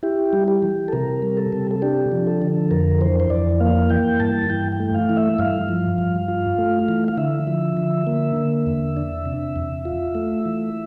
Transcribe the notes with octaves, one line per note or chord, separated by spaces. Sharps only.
E4 G4
G3
G4
E3
A4
C3 A#4
G3
A4
C3
A4
D4 G4
F3
A4
D3
F2 A#4
E3 C5
C5
F2 D5
A#3 F5
E3 G5
G2 A5
E3 G5
G5
A3
F5
E3
E5
G2 F5
F3
G2
F4
A3
E3
F5
D3 E5
F3
D3
A#3
D3
E2
D4
C3
E2
F4
A3
E3